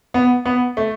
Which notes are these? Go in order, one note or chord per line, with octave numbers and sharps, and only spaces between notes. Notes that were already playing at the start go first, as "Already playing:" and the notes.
B3
B3
A3